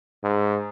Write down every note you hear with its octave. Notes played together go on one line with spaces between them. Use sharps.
G#2